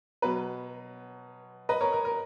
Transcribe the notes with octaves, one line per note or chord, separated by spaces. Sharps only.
B2 F#3 B4
B4 D#5
A#4 C#5
A#4
A#4